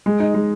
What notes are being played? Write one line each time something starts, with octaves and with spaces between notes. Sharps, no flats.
G#3
D#4
G#3